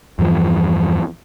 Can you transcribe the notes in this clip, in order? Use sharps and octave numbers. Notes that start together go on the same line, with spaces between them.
E2 G2 E3 F3